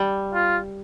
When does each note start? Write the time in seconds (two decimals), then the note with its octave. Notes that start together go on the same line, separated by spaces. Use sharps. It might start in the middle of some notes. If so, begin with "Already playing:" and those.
Already playing: G3
0.34 F4